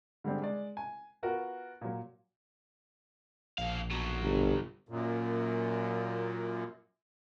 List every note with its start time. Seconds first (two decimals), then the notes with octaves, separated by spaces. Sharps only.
0.24 D3 G3 G#3 C4 D4
0.42 G#3 D5
0.77 G#5
1.23 B3 F4 F#4 A#4
1.81 A#2 F#3
3.58 A#1 B2 F5
3.91 B2 F#3
4.21 G1
4.89 F#2 A#2